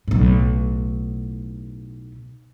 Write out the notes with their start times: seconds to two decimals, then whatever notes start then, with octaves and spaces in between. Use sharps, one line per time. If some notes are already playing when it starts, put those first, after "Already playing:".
0.08 B1 A2